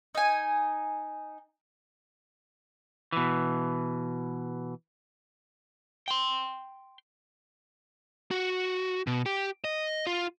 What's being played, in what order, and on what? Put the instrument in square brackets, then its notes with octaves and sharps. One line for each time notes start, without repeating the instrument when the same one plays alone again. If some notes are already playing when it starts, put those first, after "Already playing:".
[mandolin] D#4 G#5
[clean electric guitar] B2 E3
[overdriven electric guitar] G5 C6
[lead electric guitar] F#4
B2
G4
D#5
F4